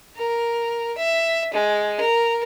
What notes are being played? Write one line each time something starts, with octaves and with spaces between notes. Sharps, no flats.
A#4
E5
G#3
A#4